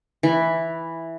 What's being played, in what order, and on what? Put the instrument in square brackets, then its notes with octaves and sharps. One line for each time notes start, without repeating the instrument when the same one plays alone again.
[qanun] E3